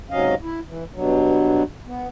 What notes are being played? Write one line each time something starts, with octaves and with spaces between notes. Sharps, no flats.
G#2 C3 F#3 C#4 D#5 F5
E4
E3
G2 B2 F#3
B3